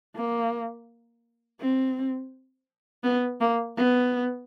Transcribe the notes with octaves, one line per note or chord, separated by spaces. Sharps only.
A#3
C4
B3
A#3
B3